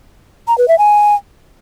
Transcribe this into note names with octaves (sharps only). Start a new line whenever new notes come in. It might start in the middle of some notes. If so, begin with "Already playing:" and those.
A#5
B4
E5
G#5